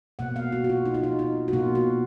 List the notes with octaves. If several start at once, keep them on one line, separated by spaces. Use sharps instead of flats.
B2 A#3 F#5
F5
F#4
F#4
F4
D#4
F4
D#4
D#4
F#4
B2 A#3 F4
F#4